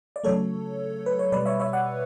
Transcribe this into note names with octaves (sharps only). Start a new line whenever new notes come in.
D5
C#3 F#3 A3 A4 C#5
B4
C#5
B2 G3 B4 D5
C#5 E5
C#5 E5
D5 F#5